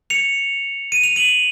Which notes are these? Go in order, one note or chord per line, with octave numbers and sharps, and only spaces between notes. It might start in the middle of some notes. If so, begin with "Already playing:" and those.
C#7 F7
D#7
F7
D#7 F#7